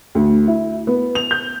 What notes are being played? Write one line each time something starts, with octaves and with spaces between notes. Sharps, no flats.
D2
E4
B3
F7
G6